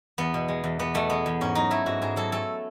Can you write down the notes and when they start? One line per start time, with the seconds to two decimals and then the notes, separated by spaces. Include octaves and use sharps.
0.18 E2 B3
0.34 B2
0.48 G#3
0.64 E2
0.79 E2 B3
0.94 B2 A3
1.10 G#3 B3
1.26 E2
1.41 G#2 C#4
1.55 F#3 D#4
1.71 A3 E4
1.86 G#2 F#4
2.02 G#2 G#4
2.16 F#3 A4
2.32 A3 A4